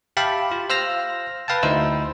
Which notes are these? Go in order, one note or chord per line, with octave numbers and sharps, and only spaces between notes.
G4 E5 F5 G5 A5 B5
F4
C5 F5 E6 F6 A#6
B4 F5 G5 A5
D2 D#4 E4 C5 E6